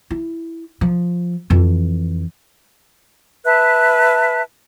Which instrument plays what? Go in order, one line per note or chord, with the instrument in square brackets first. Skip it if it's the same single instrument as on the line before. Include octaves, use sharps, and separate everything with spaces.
[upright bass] E4
F3
F2 E3
[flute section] B4 E5 A5 F#6